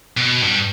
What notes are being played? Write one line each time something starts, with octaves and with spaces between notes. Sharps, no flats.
B2
G2